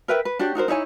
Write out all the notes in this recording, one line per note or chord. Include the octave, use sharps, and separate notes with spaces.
A#4 B4 E5 G5
B4
D4 F#4 G4 C#5
D#4 F#4 A#4 C5
D#4 E4 C#5 G#5